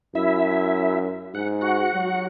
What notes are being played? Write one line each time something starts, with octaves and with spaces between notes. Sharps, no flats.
F#2 E4 E5
G#2 F#5
F#4 F#5
F#3